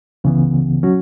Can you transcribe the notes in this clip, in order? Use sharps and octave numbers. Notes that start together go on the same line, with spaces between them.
C#2 C#3 E3 B3
F#3 C#4 F#4